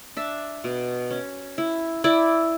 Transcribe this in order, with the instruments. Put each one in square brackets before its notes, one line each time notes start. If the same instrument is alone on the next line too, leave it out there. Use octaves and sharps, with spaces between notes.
[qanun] D4 E5
B2
C#4
E4
E4 D5